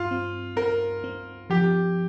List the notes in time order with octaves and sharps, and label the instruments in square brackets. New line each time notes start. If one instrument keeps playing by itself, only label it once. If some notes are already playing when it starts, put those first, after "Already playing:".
Already playing: [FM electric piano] G2 [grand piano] F4
[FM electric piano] C4
[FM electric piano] C4 [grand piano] A#4
[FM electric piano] C4
[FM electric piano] F3 [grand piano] G4